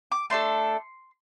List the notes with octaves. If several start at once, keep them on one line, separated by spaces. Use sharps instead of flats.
D6
A3 D4 A4 C6